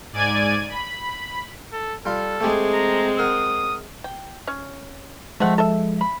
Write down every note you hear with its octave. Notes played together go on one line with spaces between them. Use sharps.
G#2 D5 G#5 G#6 D#7
B5
A4
G3 F4 A4
G#3 A3 C4 G4 G#4
A#5
A#4 F#5 D#6
G5
C#4
F3 G#3 A3 C4 F#5
A4 E5
B5